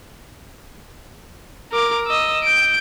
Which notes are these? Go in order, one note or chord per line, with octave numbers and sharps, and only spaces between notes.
A#4 D6
D#5 E6
G6 D7